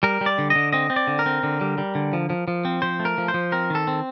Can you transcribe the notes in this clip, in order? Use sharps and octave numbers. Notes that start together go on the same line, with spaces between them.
G3 A#4
G3
D5
D3
D#5
D3
C4 D#5
C4
D5
D3
A#4
C4
D3
G3
G3
D3
F3
F3
F3
C4
F3 C5
A3
A#4
F3
C5
F3
C4 A#4
D#3 A4
C4